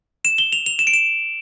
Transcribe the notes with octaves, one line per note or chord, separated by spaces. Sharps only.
E7
G7
F7
F7
E7
D7
E7